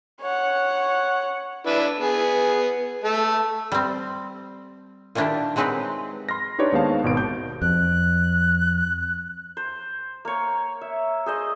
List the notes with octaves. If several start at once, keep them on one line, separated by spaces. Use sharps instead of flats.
C#5 F#5
D4 E4 B4
B3 G#4
A3 A4
G3 C4
A#2 D#3 A#3 D4 E4 G4
F#3 G#3 C4 D#4 G4 B4
B5 C6 F6 A#6
D4 D#4 G4 B4 C#5 D5
D#2 G#3 B3 C5 F5 A5
G#1 B2 D7
G6
F2 F#6
C5
A#3 C#5
E5
G#4 C5 D#5